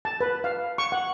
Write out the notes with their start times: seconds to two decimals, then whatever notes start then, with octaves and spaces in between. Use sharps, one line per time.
0.05 A5
0.21 B4
0.44 F5
0.78 C#6
0.92 F#5